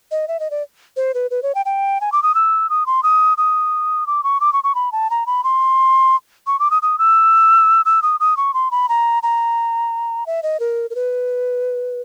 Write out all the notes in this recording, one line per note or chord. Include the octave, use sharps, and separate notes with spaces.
D#5
E5
D#5
D5
C5
B4
B4
C#5
G5
G5
G#5
D6
D#6
E6
D#6
C6
D#6
D#6
D6
C#6
D6
C#6
C#6
B5
A5
A#5
B5
C6
C#6
D6
D#6
D#6
E6
E6
D#6
D#6
C#6
C6
B5
A#5
A#5
E5
D#5
A#4
A#4
B4